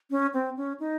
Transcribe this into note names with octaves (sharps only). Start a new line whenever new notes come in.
C#4
C4
C#4
D#4